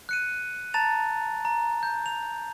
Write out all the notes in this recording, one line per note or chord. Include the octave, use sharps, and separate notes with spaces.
F#6 C#7 D#7
A5 A#5 A6 F7
A#5
G6
F7